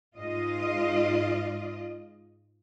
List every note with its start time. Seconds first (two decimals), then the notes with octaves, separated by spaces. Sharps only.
0.17 G#2 F4 D#5